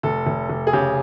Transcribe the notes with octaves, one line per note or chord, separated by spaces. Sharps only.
F1 A4
F1
F1
G#4
C#3 G4